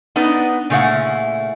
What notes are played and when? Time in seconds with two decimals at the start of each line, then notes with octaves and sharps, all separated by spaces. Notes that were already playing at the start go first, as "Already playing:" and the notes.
0.16 B3 D4 D#4 B4
0.70 A#2 C#3 A3 E4 F5 F#5